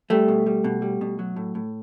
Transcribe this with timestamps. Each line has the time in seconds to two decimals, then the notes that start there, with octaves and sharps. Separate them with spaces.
0.10 G3 A3
0.28 B2
0.46 G3
0.64 B2
0.82 G3
1.01 B2
1.19 F#3
1.36 A2
1.55 A2